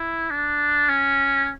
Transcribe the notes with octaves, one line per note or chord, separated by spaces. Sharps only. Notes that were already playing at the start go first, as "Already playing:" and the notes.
Already playing: E4
D4
C#4